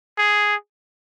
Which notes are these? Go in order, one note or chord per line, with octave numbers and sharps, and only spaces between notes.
G#4